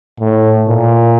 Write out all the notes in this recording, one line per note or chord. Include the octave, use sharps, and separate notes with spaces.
A2
A#2